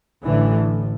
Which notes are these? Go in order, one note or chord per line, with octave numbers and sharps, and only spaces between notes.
A1 A2 D3 E3